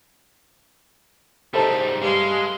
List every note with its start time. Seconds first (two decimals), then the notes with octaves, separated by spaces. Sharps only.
1.54 G#2 C3 G3 D#4 A4 C5 A5
2.02 G2 G3 G#3 C#5 F5 C6